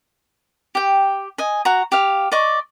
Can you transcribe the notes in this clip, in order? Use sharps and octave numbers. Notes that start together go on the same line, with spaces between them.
G4 G5
D#5 G#5
F#4 A#5
G4 F5
D5 D#5 C#6